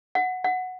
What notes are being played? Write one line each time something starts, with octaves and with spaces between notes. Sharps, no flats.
F#5
F#5